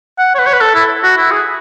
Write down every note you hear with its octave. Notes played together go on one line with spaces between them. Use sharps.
F#5
C#5
B4
C#5
B4
A4
E4
F#4
E4
G#4